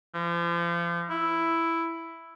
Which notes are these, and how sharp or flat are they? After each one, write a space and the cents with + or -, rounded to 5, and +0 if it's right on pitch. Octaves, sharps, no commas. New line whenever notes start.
F3 -35
E4 +5